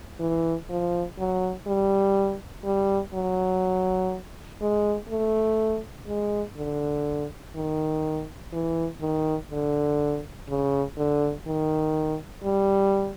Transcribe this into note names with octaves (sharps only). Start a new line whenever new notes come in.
E3
F3
F#3
G3
G3
F#3
G#3
A3
G#3
D3
D#3
E3
D#3
D3
C#3
D3
D#3
G3